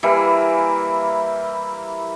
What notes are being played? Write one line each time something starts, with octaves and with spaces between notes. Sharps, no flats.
E3 G3 A#3 E4